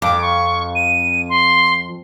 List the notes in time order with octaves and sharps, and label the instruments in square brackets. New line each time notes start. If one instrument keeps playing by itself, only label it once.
[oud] F2 [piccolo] D6
[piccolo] C#6
D#7
C6